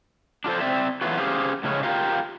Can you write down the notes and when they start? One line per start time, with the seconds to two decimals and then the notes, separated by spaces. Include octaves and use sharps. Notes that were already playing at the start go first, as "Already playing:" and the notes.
0.44 D4 F4 A4 C5
0.60 C4 D5 E5
1.01 E3 F#3 A3 B3 F4 F#4
1.18 C#4 G4 G#4 C5 F5
1.63 A2 C#3 G#3 C#4
1.83 F4 G4 A#4 F5